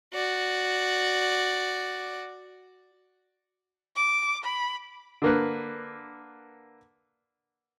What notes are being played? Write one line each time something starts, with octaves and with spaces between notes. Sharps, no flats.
F#4 D5
D6
B5
D3 A#3 B4